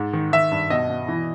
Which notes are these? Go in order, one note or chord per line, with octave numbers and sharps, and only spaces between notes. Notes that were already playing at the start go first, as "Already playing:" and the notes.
Already playing: G#2
D#3
D#3 E5
G2
B2 D#5
B2
E3